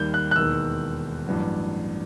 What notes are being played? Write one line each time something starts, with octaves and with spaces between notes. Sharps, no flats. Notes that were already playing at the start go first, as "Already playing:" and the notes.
Already playing: D#2 D#3 G3 G6
F#6
F#6
E1 D#2 D#3 E6
A1 G2 F#3